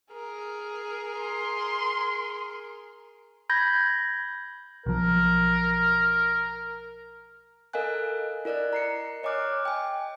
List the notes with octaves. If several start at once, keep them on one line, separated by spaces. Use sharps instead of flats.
G#4 A#4
C6
B5 G6 G#6 A#6
B1 F3 A#4
A4 A#4 D#5 F5 G#5 F#6
E4 A#4 D5 D#5 F#6
A#5 C7 C#7
C#5 D#5 G#5 D6 F6 F#6
G5 G#5